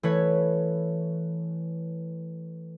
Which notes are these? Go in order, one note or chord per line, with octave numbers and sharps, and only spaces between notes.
E3 A3 B4 C#5